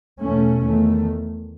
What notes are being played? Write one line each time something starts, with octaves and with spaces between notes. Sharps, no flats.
E2 B2 A3 C#4
E2 D#3 A3